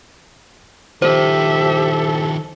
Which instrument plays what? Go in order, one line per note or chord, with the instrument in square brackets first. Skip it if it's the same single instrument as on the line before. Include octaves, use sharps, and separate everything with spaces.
[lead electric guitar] D#3 F3 [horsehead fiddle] G4 E5 [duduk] A4 [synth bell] C5